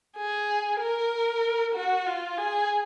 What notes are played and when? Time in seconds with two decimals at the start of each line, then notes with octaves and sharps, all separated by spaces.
0.17 G#4
0.80 A#4
1.75 F#4
2.06 F4
2.38 G#4